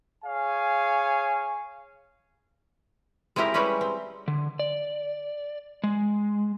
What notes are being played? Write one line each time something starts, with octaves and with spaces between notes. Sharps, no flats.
G#4 C#5 F5 G#5
G#3 C4 E4 G4 A#4
G3 G#3 C#4 G4 B4 C#5
C4
D3
D5
G#3